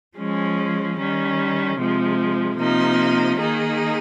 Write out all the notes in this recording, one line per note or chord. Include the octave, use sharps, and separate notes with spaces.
F3 G#3 C#4
D#3 G3 C#4
C3 F3 G#3
C3 F3 A#3 D#4
D#3 A#3 D#4 G#4